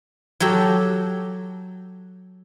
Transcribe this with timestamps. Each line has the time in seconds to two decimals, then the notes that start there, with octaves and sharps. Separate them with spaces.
0.40 F#3 F#4 G4 A4